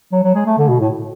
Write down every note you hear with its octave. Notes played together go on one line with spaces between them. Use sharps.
F#3
F#3
G#3
A3
D3
B2
A2